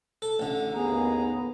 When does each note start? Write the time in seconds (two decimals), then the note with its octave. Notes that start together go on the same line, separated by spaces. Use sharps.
0.22 A4
0.39 A1 D3
0.74 D#2 B3 G#4 A#5